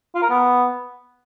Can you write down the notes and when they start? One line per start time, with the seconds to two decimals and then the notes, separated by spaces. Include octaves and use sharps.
0.15 F4
0.22 A#4
0.30 B3